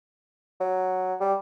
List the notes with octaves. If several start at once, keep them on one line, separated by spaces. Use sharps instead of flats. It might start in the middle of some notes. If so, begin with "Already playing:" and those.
F#3
G3